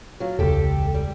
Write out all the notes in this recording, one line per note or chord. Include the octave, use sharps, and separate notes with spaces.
F#3 F4
E1 C#2 G4 A4
G3